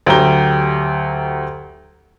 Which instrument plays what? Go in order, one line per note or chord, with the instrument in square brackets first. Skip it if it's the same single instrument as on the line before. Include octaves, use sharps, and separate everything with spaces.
[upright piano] D2 F#3 G4 A#5 G7